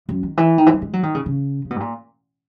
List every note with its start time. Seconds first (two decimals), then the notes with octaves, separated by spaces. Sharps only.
0.09 F#2
0.23 D#3
0.37 E3
0.58 D#3
0.66 E3
0.73 F#3
0.82 G#3
0.93 F#3
1.03 D#3
1.15 C#3
1.26 C#3
1.65 C#3
1.70 B2
1.80 A#2